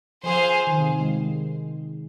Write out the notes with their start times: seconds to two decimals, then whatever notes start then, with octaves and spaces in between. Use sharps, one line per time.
0.24 F3 G#4 C5 F5 G#5
0.67 D#3
0.78 C3
0.90 D#3
1.00 G#3